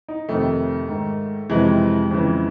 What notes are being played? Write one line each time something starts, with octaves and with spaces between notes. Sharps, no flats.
D#4
F2 C3 D#3 A3
G#2 D#3
F2 C3 E3 G#3
F2 C#3 E3